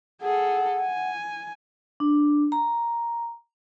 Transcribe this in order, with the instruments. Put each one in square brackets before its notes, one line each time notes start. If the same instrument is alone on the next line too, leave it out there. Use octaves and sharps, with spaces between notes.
[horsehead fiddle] G#4 A4 [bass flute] F#5
[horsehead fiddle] G#5
[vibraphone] D4
A#5